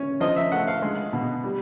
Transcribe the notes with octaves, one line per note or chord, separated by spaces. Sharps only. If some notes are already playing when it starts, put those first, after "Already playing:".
Already playing: C#4
F3 D#5
E5
A3 F#5
F5
G#3
B2
G3